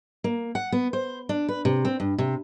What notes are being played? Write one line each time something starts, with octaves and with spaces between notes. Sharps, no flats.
A#3
F#5
B3
C5
D4
B4
C3
C4
G2
C3